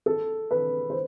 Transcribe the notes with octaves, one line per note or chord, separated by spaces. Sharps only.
A4
B4
C5